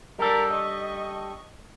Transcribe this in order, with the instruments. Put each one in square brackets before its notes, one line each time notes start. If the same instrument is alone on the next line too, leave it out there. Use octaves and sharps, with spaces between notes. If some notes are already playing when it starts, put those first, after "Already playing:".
[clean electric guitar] G3 D4 A4 [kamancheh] A#4 D5
[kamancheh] D#5 C#6